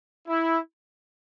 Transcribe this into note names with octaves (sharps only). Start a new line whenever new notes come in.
E4